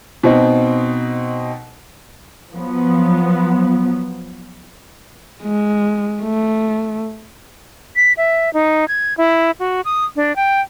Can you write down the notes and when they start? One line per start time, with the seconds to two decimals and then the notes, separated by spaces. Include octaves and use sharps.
0.23 B2 C4 D#4
2.52 F3 F#3 B3
5.43 G#3
6.23 A3
7.96 B6
8.17 E5
8.54 D#4
8.88 G#6
9.17 E4
9.60 F#4
9.85 D#6
10.16 D4
10.36 G5